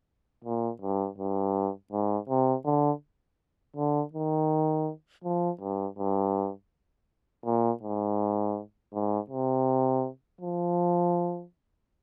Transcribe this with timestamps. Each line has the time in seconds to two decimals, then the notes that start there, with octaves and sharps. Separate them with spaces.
0.44 A#2
0.82 G2
1.18 G2
1.92 G#2
2.29 C3
2.65 D3
3.76 D3
4.13 D#3
5.24 F3
5.61 G2
5.98 G2
7.45 A#2
7.83 G#2
8.93 G#2
9.30 C3
10.41 F3